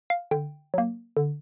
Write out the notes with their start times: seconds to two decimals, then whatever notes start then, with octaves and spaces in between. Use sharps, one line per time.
0.10 F5
0.31 D3 G5
0.74 F#3 A#3
1.17 D3